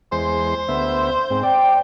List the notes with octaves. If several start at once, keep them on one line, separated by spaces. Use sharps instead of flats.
E2 G#3 C5 C6
D2 B3 E5
G#2 C4
D5 G5